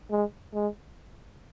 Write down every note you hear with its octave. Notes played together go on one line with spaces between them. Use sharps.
G#3
G#3